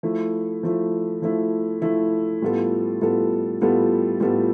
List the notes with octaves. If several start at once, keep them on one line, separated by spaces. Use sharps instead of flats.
F3 A3 E4
F3 A3 E4
F3 A3 E4
F3 A3 E4
A2 G3 B3 F4 A4
A2 G3 B3 F4 A4
A2 G3 B3 F4 A4
A2 G3 B3 F4 A4